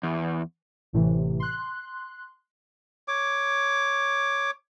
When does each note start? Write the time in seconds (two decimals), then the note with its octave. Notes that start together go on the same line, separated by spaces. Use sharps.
0.03 E2
0.93 A1 A2 C3 E3
1.40 C6 F#6
3.08 C#5 D6